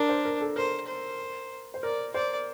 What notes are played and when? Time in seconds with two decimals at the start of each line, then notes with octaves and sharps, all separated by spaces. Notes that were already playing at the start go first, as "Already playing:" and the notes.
Already playing: D4 A#4
0.09 C5
0.25 A#4
0.41 A4
0.56 A#4 C5
0.87 C5
1.74 C5
1.83 A#4 D5
2.13 C5 D5